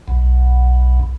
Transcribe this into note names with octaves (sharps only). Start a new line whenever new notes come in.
B1